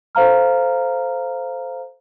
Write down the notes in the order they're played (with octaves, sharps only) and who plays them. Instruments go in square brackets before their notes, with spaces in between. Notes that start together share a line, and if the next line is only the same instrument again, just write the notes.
[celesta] A4 C5 F5 A#5 F6